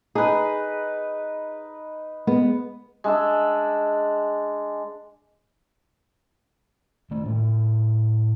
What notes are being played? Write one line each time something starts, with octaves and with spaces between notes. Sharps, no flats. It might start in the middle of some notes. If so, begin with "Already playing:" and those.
D#4 G#4 B4
G#3 B3
G#3 D4 E5
D#3 A3
A2 A#3